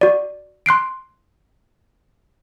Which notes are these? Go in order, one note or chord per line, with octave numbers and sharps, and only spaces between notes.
F#4 D5
C6 F#6 C7 D7